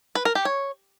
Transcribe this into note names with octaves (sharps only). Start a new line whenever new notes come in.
B4
A#4
G4
C#5